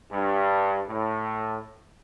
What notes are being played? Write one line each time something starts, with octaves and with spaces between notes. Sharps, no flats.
G2
A2